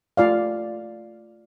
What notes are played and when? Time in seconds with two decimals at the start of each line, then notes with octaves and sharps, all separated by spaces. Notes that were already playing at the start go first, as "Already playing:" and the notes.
0.17 A3 F4 D5 F5